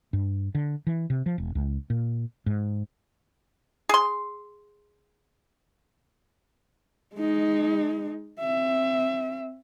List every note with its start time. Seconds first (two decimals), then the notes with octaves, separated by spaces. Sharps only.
0.13 G2
0.55 D3
0.87 E3
1.10 C3
1.26 F3
1.38 E1
1.55 C#2
1.90 A#2
2.46 G#2
3.89 G#4 C6
7.15 G#3 D#4
8.41 C4 E5